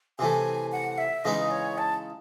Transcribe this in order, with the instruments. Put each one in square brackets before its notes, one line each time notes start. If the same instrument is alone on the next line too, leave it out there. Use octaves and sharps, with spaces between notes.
[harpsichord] C3 E3 A3 [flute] G#5
[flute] F#5
E5
[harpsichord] C#3 E3 G#3 D#4 [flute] D#5
[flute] C#5
A5